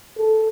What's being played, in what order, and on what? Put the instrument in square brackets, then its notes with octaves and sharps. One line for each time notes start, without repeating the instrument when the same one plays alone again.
[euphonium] A4